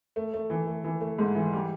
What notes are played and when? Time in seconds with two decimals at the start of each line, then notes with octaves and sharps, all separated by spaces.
0.16 A3
0.34 A3
0.50 E3
0.67 A3
0.84 E3
1.01 A3
1.19 G#2
1.35 E3
1.53 G3